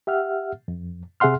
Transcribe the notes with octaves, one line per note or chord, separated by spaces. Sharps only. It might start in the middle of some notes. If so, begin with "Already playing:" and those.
G4 E5 F#5 F6
F2
C3 G#4 E5 F#5 C6 F6